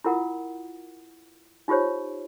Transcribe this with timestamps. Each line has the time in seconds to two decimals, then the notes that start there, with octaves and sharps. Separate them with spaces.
0.04 E4 F4 A#4 F#5 D#6
1.68 D#4 F4 G4 C5 C#5